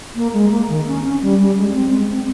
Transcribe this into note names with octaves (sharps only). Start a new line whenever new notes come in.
A#3
G#3
A#3
D#3
C#4
C#4
G3
G3
G#3
C#4
C4
G#3
C4